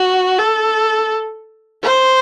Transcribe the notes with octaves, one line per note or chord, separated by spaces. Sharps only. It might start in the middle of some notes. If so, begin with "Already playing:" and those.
Already playing: F#4
A4
C5